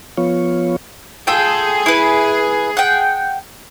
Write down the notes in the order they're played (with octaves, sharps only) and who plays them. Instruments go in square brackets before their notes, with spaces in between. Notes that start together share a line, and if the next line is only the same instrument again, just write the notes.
[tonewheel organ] F3 B3 F4 C#5
[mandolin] F4 A4 G5 [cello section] G#4
[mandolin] E4 B4
F#5 G5